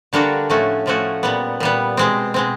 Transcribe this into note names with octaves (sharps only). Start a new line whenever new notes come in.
D3 G3 A#3 D4 F#4
A2 F3 A3 C#4 F#4
A2 F3 A3 C#4 F#4
A#2 G3 B3
A#2 G3 B3
B2 G#3 C4
B2 G#3 C4